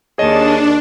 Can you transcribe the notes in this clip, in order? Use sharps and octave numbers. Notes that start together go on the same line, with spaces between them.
D#2 D4 G#4 C#5 D#5 A5